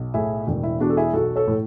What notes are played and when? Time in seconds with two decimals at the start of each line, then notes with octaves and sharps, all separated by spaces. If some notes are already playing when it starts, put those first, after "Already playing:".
Already playing: B1
0.14 A2 E4 G#4
0.47 E1
0.63 E4
0.80 E2 D4 F#4
0.90 A4
0.97 E4 G#4
1.13 B1 F#4 A4
1.36 A4 C#5
1.48 A2